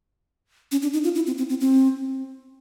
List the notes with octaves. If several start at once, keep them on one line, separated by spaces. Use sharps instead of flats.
C#4
D4
D#4
F4
E4
C4
C4
C4
C4